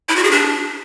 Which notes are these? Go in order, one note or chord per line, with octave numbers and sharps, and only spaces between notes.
E4
F#4
G#4
D4